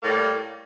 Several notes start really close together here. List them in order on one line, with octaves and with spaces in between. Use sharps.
A#3 A2 G3